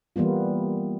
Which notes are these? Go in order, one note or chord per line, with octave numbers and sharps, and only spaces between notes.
E3 G3 A#3 B3 F4